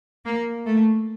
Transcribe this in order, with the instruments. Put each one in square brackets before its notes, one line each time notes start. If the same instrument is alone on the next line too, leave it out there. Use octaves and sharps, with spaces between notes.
[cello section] A#3
A3